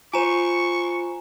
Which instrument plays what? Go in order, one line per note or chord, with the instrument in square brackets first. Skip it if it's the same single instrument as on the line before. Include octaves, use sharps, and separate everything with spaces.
[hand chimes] F4 C5 [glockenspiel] G#5 A#5 E7 [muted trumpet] C#6